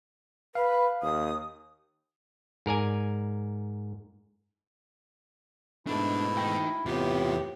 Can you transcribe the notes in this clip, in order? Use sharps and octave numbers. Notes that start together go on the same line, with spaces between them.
B4 F5
D#2 D#6
G#2 A#4 D5 G#5
G#2 B2 A3 D4 E4
D#4 G5
E2 A2 C3 B3 F4 G4